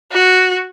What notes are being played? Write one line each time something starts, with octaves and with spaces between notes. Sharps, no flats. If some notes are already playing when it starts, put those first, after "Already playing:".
F#4